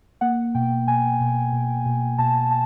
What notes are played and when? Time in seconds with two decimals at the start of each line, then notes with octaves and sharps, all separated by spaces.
0.21 A#3 F#5
0.55 B2 G5
0.87 B2 G#5
1.20 B2
1.53 B2
1.86 B2
2.18 B2 A5
2.51 A5